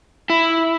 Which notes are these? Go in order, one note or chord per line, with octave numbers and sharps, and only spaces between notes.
E4